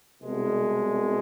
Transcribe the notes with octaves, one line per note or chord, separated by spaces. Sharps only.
C2 B2 G#3